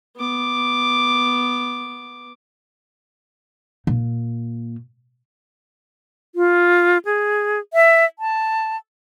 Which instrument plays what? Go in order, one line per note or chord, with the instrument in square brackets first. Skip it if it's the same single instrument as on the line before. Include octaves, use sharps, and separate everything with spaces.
[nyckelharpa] B3 D6
[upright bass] A#2
[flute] F4
G#4
E5
A5